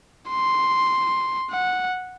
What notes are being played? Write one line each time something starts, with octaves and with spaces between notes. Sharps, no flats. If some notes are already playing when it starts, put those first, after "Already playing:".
C6
F#5